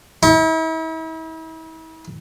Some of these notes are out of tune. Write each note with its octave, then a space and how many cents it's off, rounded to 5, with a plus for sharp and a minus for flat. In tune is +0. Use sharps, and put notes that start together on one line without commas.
E4 -40